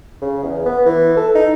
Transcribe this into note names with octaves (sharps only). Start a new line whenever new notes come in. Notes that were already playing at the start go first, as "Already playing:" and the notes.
C#3
E2
B3
E3
A4
D#4